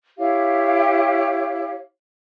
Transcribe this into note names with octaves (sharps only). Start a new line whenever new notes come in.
E4 G4 C#5 F5